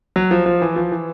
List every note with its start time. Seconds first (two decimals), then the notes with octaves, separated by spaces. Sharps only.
0.16 F#3
0.31 F3
0.46 F3
0.62 E3
0.76 F3
0.92 E3